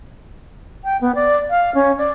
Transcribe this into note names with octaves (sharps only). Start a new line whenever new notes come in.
G5
B3
D5
F5
C#4
D5